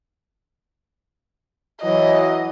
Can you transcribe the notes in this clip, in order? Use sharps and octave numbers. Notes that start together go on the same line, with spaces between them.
E3 F#3 D#5